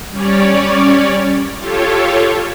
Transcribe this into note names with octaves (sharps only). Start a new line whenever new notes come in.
G3 C#4 C#5 D5
F4 G4 A4 C#5